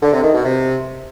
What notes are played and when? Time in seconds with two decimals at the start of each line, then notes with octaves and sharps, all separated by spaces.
0.02 D3
0.13 C3
0.23 D#3
0.34 B2
0.44 C3